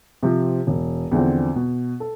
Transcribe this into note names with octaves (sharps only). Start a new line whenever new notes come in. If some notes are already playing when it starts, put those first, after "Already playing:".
C3 F3 C4
E1
E2 D3 F3 C4
B2
A4